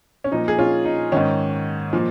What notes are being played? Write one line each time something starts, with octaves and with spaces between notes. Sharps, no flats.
C#4
A#2 F3 D#4
G#4
C#4 F4
D#4
G#2 D#3 C#4
A#2 F3